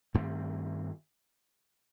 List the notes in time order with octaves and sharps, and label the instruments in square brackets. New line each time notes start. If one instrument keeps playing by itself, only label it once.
[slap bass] G2 D#3 A3 C4